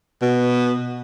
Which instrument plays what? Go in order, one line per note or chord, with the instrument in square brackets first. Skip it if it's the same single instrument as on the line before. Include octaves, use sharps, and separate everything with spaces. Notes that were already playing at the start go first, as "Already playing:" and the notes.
[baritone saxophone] B2